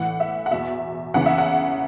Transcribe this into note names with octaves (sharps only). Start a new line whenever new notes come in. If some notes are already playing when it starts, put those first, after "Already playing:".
Already playing: A2 E3 F#5
E5
F#5
E2 B2 E5
E2 C#3 E3 F#5
E5
F#5